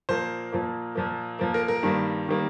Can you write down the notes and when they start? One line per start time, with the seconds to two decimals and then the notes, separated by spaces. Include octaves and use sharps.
0.09 A#2 F3 A#3 C5
0.52 A#2 F3 A#3
0.95 A#2 F3 A#3
1.39 A#2 F3 A#3
1.54 A#4
1.68 A#4
1.83 G2 D#3 G3 A#3
2.28 D#3 G3 A#3